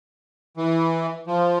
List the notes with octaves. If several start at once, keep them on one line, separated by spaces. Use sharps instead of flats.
E3
F3